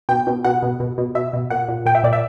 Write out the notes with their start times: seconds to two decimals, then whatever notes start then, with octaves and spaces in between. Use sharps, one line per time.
0.09 B2 G5
0.27 B2
0.44 B2 F#5
0.62 B2
0.80 B2
0.98 B2
1.15 B2 E5
1.33 B2
1.50 A#2 F#5
1.68 A#2
1.86 A#2 G5
1.95 E5
2.04 A#2 D5
2.13 E5